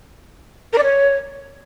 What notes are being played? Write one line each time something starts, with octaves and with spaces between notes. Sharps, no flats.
A#4
D5
C#5